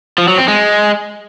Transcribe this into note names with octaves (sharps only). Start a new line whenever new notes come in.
F3
F#3
C4
G#3